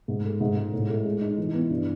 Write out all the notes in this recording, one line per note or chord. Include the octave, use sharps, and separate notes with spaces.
G#2
A3
G#2
G#3
A2
A3
G#3
D#4
E3
B3
G2